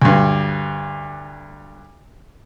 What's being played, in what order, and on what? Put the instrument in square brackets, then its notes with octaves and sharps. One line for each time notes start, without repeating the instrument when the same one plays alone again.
[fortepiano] D2 G2